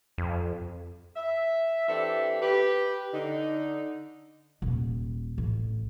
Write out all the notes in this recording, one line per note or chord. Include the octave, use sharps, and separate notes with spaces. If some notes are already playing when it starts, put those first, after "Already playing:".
F2
E5
E3 C4 D4 G4 A4 E5
G4 B4
D3 D#4
D#1
A1